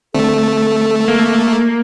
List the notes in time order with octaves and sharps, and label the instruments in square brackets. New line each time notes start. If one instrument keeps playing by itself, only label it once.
[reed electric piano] D3 C4 [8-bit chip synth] A3 [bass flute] A4
[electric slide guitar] A#3